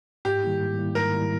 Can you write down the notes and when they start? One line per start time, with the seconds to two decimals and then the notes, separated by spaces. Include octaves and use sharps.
0.25 G#2 G4
0.43 D#3 G3 A#3 E4
0.61 G#2
0.78 D#3 G3 A#3 E4
0.95 G#2 A#4
1.13 D#3 G3 A#3 E4